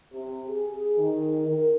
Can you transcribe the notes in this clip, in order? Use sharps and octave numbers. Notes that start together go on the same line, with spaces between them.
C3
G#4
D#3
A#4